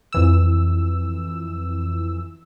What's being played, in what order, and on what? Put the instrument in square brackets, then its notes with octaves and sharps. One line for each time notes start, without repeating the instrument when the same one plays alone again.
[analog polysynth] F2 E3 E6